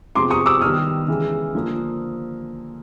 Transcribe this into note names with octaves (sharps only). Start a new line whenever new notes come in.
C3 F3 G#3 B3 C6 D6
C#6 D#6
D6 E6
D#3 G3 B3 D#6 F6
C#3 E3 G#3
D3 F3 A#3